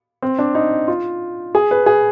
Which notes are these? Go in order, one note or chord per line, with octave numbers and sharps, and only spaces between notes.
C4
D4
D#4
F4
G#4
B4
G#4